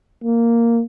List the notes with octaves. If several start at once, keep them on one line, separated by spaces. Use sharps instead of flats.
A#3